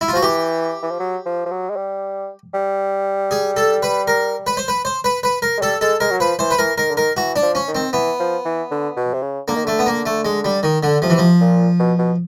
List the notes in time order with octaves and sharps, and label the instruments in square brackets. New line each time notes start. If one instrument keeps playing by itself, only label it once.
[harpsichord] E4
F4
[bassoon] F3 [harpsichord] F#4
[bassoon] E3 [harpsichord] G4
[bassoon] E3
F3
F#3
F3
F3
F#3
G#3
G3
G3
[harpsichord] G#4
A4
B4
A#4
B4
C5
B4
C5
B4
B4
A#4
[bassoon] G#3
[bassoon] G3 [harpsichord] A4
[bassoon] G#3 [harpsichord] A4
[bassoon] G#3 [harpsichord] A#4
[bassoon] F#3
[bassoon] F3 [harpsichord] B4
[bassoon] E3 [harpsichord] C5
[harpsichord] B4
[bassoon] E3 [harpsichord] A#4
[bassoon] D#3 [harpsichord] A#4
[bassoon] D3
[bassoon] D#3 [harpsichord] A#4
[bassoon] E3 [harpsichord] F#4
[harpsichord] D4
[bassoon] F3
[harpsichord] C#4
[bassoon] D#3
[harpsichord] C4
[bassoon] E3 [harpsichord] B3
[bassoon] F3
E3
D3
B2
C3
C#3
[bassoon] D3 [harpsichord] A#3
[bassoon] D#3
[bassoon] D3 [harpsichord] A3
[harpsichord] B3
A#3
A3
G#3
G3
D#3
D3
[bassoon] C3 [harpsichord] F3
[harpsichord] E3
F3
[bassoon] A#2
B2
B2